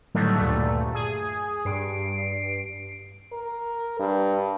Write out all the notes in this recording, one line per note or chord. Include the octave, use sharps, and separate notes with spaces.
A2 D3 D#3 F#3 G3 A3
D2 G2 A#2 A3
G#4
G2 C7 D7
A#4
G2